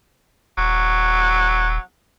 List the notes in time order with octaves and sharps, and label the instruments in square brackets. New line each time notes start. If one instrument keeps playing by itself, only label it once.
[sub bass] D#1 [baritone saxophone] F#3